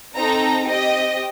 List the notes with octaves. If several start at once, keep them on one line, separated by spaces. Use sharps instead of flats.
C4 D#4 A4 A#5
C4 G4 D#5